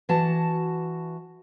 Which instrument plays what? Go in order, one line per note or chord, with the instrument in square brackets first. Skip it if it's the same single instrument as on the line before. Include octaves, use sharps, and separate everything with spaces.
[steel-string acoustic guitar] E3 F#4 A5